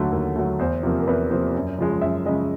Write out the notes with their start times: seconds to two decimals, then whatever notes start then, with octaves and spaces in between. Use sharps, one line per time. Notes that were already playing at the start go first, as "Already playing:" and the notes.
Already playing: D#2 D3 F#3 A3
0.12 D#2
0.36 D3 F#3 A3
0.59 E2 C5
0.83 C3 F3 A#3
1.01 A#4
1.07 E2 B4
1.30 C3 F3 A#3 C5
1.55 F#2
1.79 C#3 F3 G#3
2.01 F#2 E5
2.26 C#3 F3 G#3 D#5